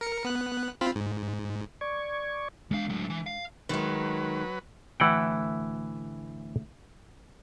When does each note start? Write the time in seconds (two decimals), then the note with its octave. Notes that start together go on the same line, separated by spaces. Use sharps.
0.01 A#4 C#7
0.25 B3 F#6
0.81 C4 F4 B5
0.95 G#2
1.81 D5 C#6 G#6
2.71 E2 G#3 D4 F5
2.89 A2 F#3
3.10 E3
3.26 F5
3.69 D#3 F#3 G#3 B4
5.00 D2 A2 E3 E4 F#5 G5